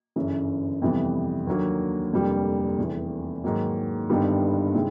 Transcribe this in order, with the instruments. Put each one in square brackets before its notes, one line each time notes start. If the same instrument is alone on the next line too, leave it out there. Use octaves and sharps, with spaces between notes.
[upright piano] G1 F#2 C#3 E3
F2 C3 E3 G3 B3
D#2 D3 F#3 A#3
F1 F2 D3 G3 A#3
F1 E2 C3
G#2 D#3 F#3 A#3
G1 G2 D#3 G3 B3
C3 D#3 G#3 C4 E4